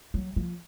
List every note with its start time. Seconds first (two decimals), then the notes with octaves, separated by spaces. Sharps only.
0.14 F#3
0.36 F3